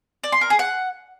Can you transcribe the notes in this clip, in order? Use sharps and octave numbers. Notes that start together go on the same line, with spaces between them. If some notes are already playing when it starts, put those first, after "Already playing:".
D5
C6
A#4
G#4
F#5